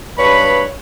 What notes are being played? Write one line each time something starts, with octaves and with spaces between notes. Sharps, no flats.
G2 B4 C#5 B5